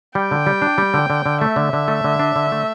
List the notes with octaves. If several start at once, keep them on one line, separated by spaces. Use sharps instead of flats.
G3 G5
D3
G3
D4
G3
D3
D3
D3
A3 E5
D3
D3
A3
D3
D4
D3
A3